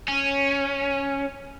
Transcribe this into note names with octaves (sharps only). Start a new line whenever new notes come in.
C#4